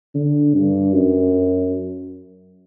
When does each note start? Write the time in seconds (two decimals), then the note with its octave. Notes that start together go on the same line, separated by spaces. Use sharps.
0.15 D3
0.55 G2
0.93 F#2